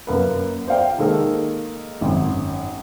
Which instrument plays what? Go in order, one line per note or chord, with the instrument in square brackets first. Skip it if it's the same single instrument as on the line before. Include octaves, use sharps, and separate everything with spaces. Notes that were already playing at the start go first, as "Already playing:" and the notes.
[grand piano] F#2 A#3 B4
C5 D5 F5 G5
D#3 G#3 A#3 A4
G#1 F#2